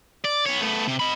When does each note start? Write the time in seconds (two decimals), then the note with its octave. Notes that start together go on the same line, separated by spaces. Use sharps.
0.25 D5
0.46 B3 C#5
0.61 A3 B3
0.87 C3
0.99 D#5 B5